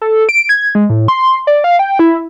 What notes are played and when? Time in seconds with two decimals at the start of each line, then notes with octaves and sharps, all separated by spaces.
0.01 A4
0.29 D7
0.49 G#6
0.75 G#3
0.90 A2
1.08 C6
1.47 D5
1.64 F5
1.79 G5
1.99 E4